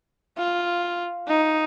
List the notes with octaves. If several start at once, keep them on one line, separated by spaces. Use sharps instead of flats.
F4
D#4